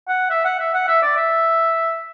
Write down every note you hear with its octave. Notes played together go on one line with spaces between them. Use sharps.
F#5
E5
F#5
E5
F#5
E5
D5
E5